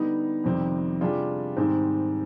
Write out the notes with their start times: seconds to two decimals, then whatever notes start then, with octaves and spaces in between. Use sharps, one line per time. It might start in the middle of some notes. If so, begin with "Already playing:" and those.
Already playing: D3 G3 B3 D#4
0.44 F2 C3 D#3 G3 C4
1.01 C3 G3 D4 F4 G#4
1.57 G#2 D#3 G3 C4 D#4